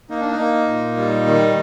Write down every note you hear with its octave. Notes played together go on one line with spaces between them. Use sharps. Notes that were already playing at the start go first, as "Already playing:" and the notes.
A#3 D#4
D4
D#4
A#3
A#2
G3
D#3